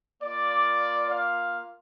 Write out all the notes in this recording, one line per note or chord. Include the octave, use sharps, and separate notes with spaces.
A#3 F4 D5
F5